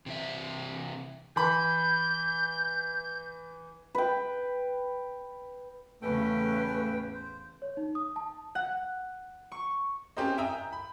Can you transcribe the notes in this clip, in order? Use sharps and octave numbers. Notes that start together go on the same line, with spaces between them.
C3 E3 E5
E3 B5 G6
B4 G5
E2 A2 C#3 A3 C#4 B4 G5
C5
C#5
D#4
D#6
A5
F#5
C#6
C4 C#4 G4 A#4 C5 D#5
E5 G5 G#5 A#5 D#6 E6
G6
B5